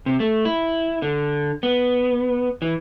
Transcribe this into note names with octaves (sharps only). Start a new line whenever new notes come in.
C3
A3
E4
D3
B3
E3